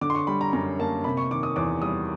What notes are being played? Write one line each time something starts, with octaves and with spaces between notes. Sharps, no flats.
D3 D6
C6
C#6
G3 B5
A#5
F#2 A#5
A#3 A5
C3 B5
C#6
D#3 D6
D#6
E2 D6
G3 D#6